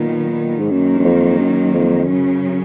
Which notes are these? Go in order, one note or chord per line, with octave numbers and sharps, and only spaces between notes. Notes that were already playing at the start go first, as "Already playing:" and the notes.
Already playing: A#2 D#3 F#3 B3
G#2
F#2 D#3 F#3 A#3
F#2
F2
F#2
F2
F#2 C#3 F#3 C#4